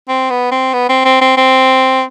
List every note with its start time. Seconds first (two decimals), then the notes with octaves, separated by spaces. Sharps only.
0.09 C4
0.30 B3
0.52 C4
0.73 B3
0.89 C4
1.05 C4
1.21 C4
1.37 C4